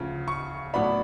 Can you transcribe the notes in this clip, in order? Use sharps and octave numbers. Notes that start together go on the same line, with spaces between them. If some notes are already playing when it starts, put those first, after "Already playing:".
Already playing: D2 C#3 F3
C#6
A2 F#3 B3 D4 B5